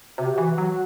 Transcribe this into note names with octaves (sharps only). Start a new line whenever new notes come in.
C3 F#4
G4
E3 F#4
F#3